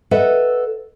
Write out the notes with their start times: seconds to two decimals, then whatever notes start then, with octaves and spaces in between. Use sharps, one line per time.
0.11 A4 B4 D#5 E5 F#5